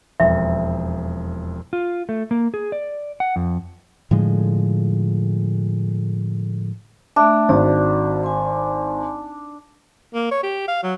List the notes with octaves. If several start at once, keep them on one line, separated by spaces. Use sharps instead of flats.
E1 F2 E5
F4
A3
A#3
G#4
D5
F#5
F2
A2 D3 F3 G#3
A3 D4 E5
G#1 F#4 D5
G#5 C6
A#3
C#5
G4
F5
F#3